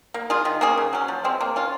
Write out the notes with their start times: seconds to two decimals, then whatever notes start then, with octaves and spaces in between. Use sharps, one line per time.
0.14 A#3
0.30 F4 G#4
0.45 D#3
0.61 A#3 C#4 G#4
0.78 C#3
0.93 F#3 C#4
1.08 F3
1.24 G#3 C4
1.41 A#3
1.56 C#4 F4